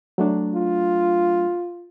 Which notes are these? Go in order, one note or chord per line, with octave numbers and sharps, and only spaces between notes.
F#3 A3 D4
F4